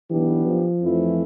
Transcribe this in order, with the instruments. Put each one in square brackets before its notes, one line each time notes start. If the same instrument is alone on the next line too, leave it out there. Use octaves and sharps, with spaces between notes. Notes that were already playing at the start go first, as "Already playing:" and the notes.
[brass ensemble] B1 B2 B3 D4 G4 [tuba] E3
[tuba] F3
[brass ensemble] F2 E3 A3 E4